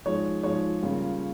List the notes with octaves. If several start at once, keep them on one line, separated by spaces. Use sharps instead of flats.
G#2 F3 G#3 C#5
G#2 F3 G#3 C#5
C#3 G3 A#3 F4